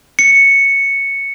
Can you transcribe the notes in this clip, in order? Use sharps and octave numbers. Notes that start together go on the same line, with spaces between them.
C#7